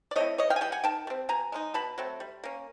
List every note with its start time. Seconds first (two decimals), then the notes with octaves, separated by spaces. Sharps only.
0.11 D5
0.16 A3 C4 E4 C#5 D#5
0.38 C#3 C#5 D#5
0.50 F5 G5
0.56 G#5
0.61 E3 G3 G5
0.72 F#5 G#5
0.84 D#3 G5 A5
1.07 G3 C4
1.29 B2 G#5 A#5
1.52 G#3 C4 D#4
1.74 B2 A5 B5
1.98 F#3 A3 C4
2.20 G3
2.44 A#3 C#4